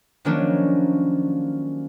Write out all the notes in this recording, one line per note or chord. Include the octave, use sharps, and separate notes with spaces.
D#3 F3 F#3 A#3 C#4 D4